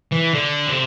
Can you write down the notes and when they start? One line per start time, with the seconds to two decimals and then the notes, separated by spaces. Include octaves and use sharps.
0.12 E3
0.34 D3
0.68 C3